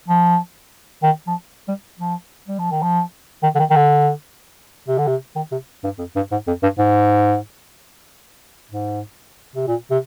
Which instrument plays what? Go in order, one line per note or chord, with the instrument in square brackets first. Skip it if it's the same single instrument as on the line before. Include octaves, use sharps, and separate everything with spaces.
[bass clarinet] F3
D#3
F3
G3
F3
G3
F3
D#3
F3
D#3
D3
D#3
D#3
D3
C3
D3
C3
D#3
C3
G2
F2
G2
G#2
F2
G2
G#2
G#2
C3
A#2
C3